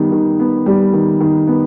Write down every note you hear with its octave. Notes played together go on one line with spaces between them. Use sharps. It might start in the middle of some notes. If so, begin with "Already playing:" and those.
Already playing: D#3 G3 B3
D#3
B3
G3
D#3
D#3
B3